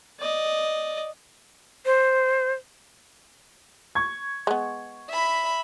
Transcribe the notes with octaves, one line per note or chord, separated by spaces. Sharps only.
D5 D#5
C5
C#6 G#6
G#3 B3
E5 B5